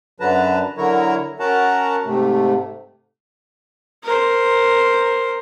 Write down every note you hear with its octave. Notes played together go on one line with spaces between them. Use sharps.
F#2 D3 F#3 B4 A5 A#5
D3 F#3 E4 A#4 C#5 A#5
C#4 F#4 A#4 F#5 A5 A#5
G#2 C3 A3
A#4 C5